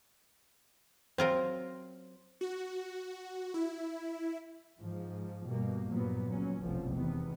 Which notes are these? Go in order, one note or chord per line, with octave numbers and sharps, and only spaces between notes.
F#3 C4 F4 A#4 C5
F#4
E4
G#2 F3
G1 B2 G3 A#3
G2 A#2 F3 F#3 A#3 B3
C#2 F#3 C#4
F1 B1 F3
E2 C3 D#3 B3